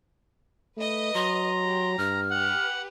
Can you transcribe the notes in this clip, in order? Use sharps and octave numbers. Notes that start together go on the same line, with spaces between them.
A3 B4 D#5
F#3 A#5 C6
G4
G2 F6
G4 B4 F#5